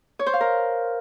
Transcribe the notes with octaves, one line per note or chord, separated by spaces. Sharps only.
C#5
C5
F5
A#4